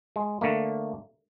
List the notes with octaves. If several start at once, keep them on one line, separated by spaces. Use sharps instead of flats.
G#3
D3 A3 A#3